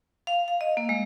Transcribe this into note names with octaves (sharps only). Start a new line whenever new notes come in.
F5
F5
D#5
A#3
G#3